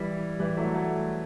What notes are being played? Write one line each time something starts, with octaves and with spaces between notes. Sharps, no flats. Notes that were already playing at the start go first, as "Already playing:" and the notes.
Already playing: E3 G3
E3 G3
F#3 A3
F#3 A3